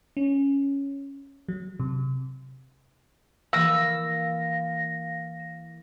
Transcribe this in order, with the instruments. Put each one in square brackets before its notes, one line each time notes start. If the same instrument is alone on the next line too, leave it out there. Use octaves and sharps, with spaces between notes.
[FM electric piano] C#4
F#3
C3
[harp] E3 A#3 [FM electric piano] F5 A#6 [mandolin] E6